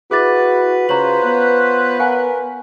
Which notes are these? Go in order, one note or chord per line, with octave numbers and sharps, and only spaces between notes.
E4 F#4 G#4 B4 D6 A6
C#3 F4 C5 C#5 A#5 F#7
B3
A#4 F5 F#5 G#5